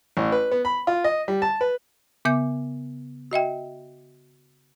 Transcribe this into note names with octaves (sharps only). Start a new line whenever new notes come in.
A1
B4
B3
B5
F4
D#5
G3
A5
B4
C#3 B3 E5 D6 G6
F#4 D#5 E5 G5